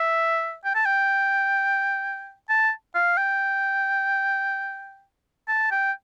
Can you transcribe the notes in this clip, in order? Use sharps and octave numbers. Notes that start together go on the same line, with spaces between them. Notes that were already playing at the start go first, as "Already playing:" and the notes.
Already playing: E5
G5
A5
G5
A5
F5
G5
A5
G5